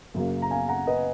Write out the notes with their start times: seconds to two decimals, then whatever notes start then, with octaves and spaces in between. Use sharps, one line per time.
0.14 F#2 C#3 F#3 A#3 C#4
0.42 A#5
0.51 F5 G#5
0.68 F#5 A#5
0.87 B4 D#5